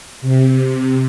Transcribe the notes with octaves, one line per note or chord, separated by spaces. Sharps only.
C3